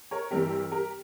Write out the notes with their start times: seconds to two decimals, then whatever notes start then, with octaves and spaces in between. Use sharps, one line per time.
0.11 A#4 C#5
0.31 G2 E3 G3 C4 G4 A#4
0.71 G4 A#4